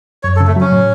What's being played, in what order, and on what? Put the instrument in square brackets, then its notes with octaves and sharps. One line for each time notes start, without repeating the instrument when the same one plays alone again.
[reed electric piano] F#2 [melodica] C#5
[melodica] A4
[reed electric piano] C#3
[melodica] A3
[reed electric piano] F#3 [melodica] C#4
[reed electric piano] A2